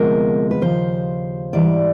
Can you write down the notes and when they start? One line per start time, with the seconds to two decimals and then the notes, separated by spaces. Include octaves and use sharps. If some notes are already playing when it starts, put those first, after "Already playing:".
Already playing: D2 C3 F3 G#3 B3 A#4
0.51 B4
0.62 D#2 C#3 F3 C5
1.53 G#2 E3 G3 D5